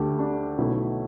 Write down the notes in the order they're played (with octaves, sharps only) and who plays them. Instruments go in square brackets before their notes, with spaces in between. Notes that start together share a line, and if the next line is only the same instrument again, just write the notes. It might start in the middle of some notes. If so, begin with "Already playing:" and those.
Already playing: [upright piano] D2 D3 A3 G4
D4
B1 B2 A3 E4